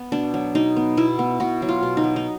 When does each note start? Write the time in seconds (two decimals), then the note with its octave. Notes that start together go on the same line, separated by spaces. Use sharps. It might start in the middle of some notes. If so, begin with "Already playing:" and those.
Already playing: B3
0.12 B2 D4
0.34 F#3
0.55 B2 D#4
0.76 B3
0.97 B2 E4
1.19 B3
1.40 B2 F#4
1.62 F#3
1.69 F4
1.83 B2
1.97 D#4
2.04 F#3
2.16 D#4